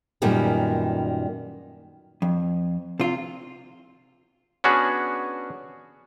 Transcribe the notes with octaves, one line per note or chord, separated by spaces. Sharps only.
F#2 A#2 D#3 G3 B3
F2
C3 F4
B3 C#4 D4 F#4 G#4